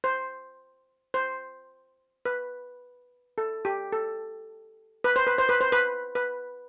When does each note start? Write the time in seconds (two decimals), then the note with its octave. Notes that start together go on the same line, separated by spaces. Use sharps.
0.04 C5
1.14 C5
2.25 B4
3.38 A4
3.65 G4
3.93 A4
5.04 B4
5.16 C5
5.27 B4
5.38 C5
5.49 B4
5.61 C5
5.72 B4
6.15 B4